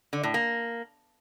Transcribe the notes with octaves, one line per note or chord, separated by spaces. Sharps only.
D3
A2
A#3